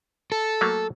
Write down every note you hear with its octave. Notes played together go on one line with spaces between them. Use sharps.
A4
F#3 A3 A#3